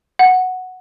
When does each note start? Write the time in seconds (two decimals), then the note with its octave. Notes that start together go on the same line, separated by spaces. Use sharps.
0.19 F#5